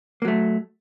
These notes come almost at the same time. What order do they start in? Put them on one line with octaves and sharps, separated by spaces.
A#3 F#3 A3